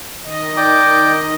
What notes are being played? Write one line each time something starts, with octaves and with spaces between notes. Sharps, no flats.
D#3 D#5
D5 G5 D6